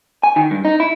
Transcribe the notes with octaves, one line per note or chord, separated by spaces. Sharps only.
G#5
D#3
G2
D#4
E4